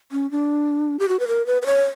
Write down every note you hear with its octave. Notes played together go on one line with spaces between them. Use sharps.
C#4
D4
G4
F#4
B4
A#4
B4
B4
C#5